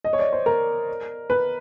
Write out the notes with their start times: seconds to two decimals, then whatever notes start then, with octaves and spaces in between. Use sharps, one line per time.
0.04 D#5
0.13 C#5
0.19 D5
0.33 C5
0.46 A#4
1.30 B4